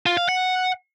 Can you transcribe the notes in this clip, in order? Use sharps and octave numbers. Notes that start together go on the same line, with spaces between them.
F4
F5
F#5